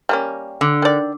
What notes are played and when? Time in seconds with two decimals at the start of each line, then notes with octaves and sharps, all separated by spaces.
0.09 G3 A#3 C#4
0.61 D3
0.82 D#3 D5